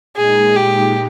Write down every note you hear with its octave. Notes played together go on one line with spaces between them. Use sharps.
A#2 G#3 D#4 G#4
G4